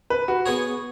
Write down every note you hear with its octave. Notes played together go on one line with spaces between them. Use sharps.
B4
F#4
B3 G#4 C#5